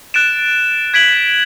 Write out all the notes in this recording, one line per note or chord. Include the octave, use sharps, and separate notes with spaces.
F#6 A6 D7 E7
G#6 B6 D7 F#7